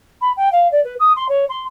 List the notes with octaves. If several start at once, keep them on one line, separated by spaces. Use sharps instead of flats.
B5
G5
F5
D5
B4
D#6
C6
C#5
C6